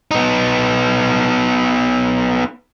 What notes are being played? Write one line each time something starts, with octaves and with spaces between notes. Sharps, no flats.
B3 D#4